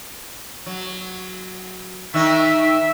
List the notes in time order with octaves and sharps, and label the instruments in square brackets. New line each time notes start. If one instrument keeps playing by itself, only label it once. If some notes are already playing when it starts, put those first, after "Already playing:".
[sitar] F#3
[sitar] D#3 D#4 [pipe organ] E5